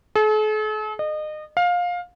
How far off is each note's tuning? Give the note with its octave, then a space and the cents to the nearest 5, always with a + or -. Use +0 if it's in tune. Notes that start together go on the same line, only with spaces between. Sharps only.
A4 -45
D#5 -30
F5 +20